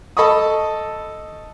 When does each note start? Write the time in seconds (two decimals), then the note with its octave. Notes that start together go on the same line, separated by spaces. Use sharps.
0.17 A4 D#5 B5 C#6 D#6